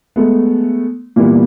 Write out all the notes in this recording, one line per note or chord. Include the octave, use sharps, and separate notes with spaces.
G#3 A3 B3
A#2 E3 G3 A#3 B3